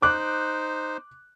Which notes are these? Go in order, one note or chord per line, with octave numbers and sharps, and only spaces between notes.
D#4 C5 D6 F#6